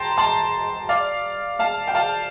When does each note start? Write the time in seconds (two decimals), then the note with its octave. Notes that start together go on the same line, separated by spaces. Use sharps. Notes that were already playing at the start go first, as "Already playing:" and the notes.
Already playing: G5 A5 A#5 C6
0.18 A5 C6
0.89 D5 F5
1.59 F5 A5
1.88 G5
1.95 F5 A5